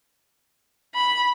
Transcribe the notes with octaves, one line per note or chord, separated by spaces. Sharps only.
B5